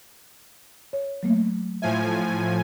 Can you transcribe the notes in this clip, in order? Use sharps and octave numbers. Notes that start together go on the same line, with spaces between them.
C#5
F#3 A3 A#3
A2 F3 E5 G#5